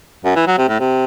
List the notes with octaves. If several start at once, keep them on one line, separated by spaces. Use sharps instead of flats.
F#2
E3
F#3
C3
A2
C3